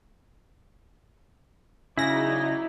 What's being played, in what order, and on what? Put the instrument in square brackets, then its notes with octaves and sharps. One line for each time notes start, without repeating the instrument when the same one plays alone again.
[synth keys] C#3 A#6 [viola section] F#3 D#4 D5 [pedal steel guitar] E4